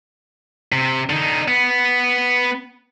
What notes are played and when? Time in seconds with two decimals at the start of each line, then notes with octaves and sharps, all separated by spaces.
0.72 C3
1.10 D3 D#4
1.48 B3